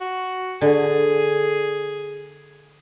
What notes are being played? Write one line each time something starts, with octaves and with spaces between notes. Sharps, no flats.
F#4
D3 G#4